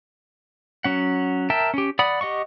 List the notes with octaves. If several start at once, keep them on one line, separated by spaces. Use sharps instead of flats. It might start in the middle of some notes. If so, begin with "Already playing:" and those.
F#3 C#4 F#5
A#4 E5 G5 A5
C#4 G4
D5 F#5 B5 D#6
G4 D#5 F#5 C#6